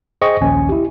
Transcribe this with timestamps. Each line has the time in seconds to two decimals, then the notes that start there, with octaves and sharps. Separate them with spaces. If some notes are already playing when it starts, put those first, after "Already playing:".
0.21 G#4 C5 D#5 G5 C#6
0.41 A#1 D#2 C#4 G#5
0.69 E4 G4